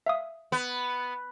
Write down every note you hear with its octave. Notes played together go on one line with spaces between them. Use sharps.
E5 F5 D#6
B3